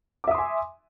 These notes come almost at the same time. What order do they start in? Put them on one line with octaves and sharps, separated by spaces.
D6 E5 D#6 C6 G#5